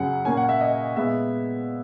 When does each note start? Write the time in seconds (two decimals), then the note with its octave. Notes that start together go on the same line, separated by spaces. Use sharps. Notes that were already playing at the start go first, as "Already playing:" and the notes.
Already playing: F#2 C#3 F#3 F#5
0.25 A#2 A#3 C#4 G#5
0.37 F#5
0.49 E5
0.61 D#5
0.96 A#2 G#3 B3 E5